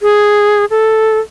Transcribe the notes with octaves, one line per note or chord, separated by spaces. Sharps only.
G#4
A4